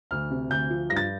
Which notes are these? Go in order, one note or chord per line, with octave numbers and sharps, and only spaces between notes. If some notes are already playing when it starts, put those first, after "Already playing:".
D2 F6
C3
D2 G6
F3
G2 A#6
A6